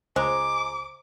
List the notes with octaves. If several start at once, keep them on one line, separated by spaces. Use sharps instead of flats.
C#2 G#3 C5 A#5 D6